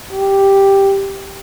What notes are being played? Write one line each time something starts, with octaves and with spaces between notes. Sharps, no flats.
G4